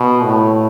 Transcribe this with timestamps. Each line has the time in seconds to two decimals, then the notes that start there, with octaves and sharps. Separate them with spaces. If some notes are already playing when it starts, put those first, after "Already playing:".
Already playing: B2
0.24 A2